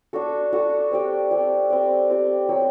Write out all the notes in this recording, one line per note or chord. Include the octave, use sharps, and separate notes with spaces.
D4 F#4 A4
D4 F#4 A4
C4 G4 D5
C4 G4 D5
C4 G4 D5
C4 G4 D5
F#3 C4 G4